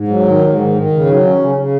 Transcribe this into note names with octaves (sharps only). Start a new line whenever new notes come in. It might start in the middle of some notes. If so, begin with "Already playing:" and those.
Already playing: G#2
F#3
D#3
G#2
D#3
D#3
C#3
F#3
C#4
C#3
C#3